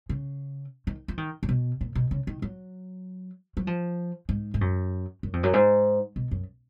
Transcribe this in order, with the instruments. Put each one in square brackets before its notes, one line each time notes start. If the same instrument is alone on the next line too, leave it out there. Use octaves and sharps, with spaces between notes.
[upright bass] C#3
D#3
F3
D#3
C#3
B2
A#2
B2
C#3
D#3
F#3
F#3
F3
G#2
G#2
F#2
F#2
F2
F#2
G#2
B2
F#2